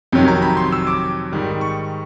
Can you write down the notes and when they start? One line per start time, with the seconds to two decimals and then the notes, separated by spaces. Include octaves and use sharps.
0.12 F2 C3 D#3 F#3
0.28 A#5
0.42 B5
0.57 C6
0.72 E6
0.87 D6
1.32 G#2 D#3 G3
1.61 C#6